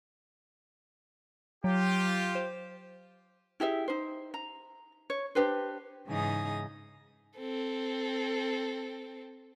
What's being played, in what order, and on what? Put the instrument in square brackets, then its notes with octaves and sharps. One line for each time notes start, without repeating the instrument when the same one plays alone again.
[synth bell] F#3 [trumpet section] F4 G4
[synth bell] C5
[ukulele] E4 G4 G#4 E5
D#4 C5
A#5
C#5
D4 G4 B4 C5
[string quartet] G#2 C#3 E3 D#4 G#4 D#6
[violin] C4 A4